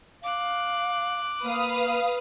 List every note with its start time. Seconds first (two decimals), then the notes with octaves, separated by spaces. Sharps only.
0.23 F5 D6 F#6
1.43 A#3 B4 F5 D#6